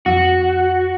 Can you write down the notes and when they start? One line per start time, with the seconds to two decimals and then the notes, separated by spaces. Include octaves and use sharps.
0.06 F2 F#4